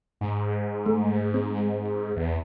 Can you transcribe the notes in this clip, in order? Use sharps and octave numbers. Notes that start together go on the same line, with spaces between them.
G#2
A3
C4
E2